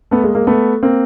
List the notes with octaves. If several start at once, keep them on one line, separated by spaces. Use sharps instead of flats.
A3 B3
G#3 A#3
G#3 A#3
A3 B3
A#3 C4